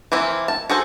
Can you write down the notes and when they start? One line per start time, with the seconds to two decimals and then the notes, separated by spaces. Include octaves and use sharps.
0.12 E3 A#3 C4 E4
0.48 A5
0.70 F#4 G#4 A4 C5